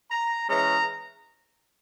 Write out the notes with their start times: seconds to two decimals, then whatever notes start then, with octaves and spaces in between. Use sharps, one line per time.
0.11 A#5
0.49 E3 G#3 C#4 A#5